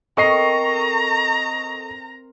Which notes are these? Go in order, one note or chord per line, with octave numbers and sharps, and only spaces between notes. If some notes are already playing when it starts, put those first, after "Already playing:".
C4 A4 A#4 D#5 A#5 C#6 C7